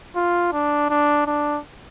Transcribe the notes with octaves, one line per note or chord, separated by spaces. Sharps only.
F4
D4
D4
D4